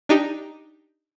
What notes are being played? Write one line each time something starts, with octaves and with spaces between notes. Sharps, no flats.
D4 D#4 G4